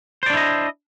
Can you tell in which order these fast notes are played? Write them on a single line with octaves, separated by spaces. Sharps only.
C5 D5 D4 E4 D#5